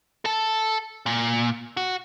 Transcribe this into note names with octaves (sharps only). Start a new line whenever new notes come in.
A4 A5
A#2
F#4